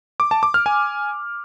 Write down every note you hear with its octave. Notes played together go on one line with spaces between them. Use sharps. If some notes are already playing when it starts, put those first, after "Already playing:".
D6
A5
D6
F6
G#5